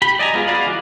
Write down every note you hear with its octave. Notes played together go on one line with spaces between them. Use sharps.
G4 B5
D5 D#5 G#5 A#5
G#3 B3 F4 G#4
F#4 G#4 D5 F5 B5
E3 D6 F#6